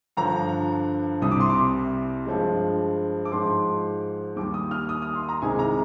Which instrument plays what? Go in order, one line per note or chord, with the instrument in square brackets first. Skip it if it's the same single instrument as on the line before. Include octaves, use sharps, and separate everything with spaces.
[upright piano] G2 D3 F3 A#5
C2 C3 G3 D#6
D6
C6
D6
G2 F3 G#3
D6
G#2 F3 G#3 C6
D#2 D#3 G3 D6
D#6
F6
D#6
D#6
C6
A#5
C2 C3 D#3 G#3 G#5
A#5